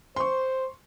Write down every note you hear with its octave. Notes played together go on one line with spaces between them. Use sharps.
C5 C6 C#6